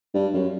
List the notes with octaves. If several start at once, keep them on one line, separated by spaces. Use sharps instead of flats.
G2
F#2